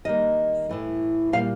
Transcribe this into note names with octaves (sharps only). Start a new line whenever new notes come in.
D#3 G3 A#3 D#5
A2 E3 A3
A#2 G3 A#3 F5